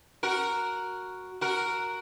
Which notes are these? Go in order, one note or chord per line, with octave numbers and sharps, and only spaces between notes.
F#4 A#4
F#4 A#4